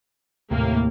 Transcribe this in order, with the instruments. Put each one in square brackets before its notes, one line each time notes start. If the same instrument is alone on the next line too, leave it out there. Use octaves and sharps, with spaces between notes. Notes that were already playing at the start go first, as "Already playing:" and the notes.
[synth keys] D#2 C3 [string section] A2 A#3